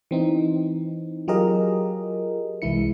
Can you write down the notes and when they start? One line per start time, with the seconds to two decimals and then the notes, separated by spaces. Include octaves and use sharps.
0.11 E3 C4 D#4
1.28 F#3 F4 G4 G#4 A#4 D#5
2.62 C2 E3 G#3 E4 C#7